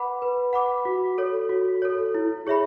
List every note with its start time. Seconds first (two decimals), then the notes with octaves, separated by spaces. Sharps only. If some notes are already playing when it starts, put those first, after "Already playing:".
Already playing: B4 F#5 B5 D6
0.22 B4
0.53 F#5 B5 D6
0.85 F#4
1.18 A4 C#5
1.49 F#4
1.82 A4 C#5
2.15 E4
2.47 G#4 C#5 E5 B5